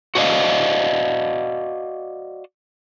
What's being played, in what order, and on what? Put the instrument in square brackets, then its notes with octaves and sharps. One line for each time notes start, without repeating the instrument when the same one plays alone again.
[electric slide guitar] F#4 C5 D5 D#5 F5